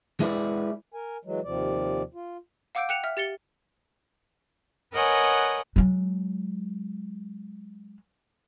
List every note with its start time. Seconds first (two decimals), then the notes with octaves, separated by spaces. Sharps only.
0.20 G#3 E4 B4 D5
0.94 A#4 G#5
1.25 E3 F#3 G#3
1.44 D#2 C3 F3 D5
2.14 F4
2.75 F5 F#5 D6 E6 G6 D7
2.89 G5 F#6 C#7 E7 F7
3.04 E5 F6
3.17 G4 A6 C#7 G7
4.93 A#4 B4 C#5 D#5 F#5 G#5
5.76 F#3 G#3